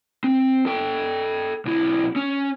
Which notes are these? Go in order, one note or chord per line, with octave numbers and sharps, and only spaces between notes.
C4
A4 G5
B1 E4
C#4